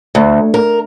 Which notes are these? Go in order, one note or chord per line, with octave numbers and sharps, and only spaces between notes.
D2
A#4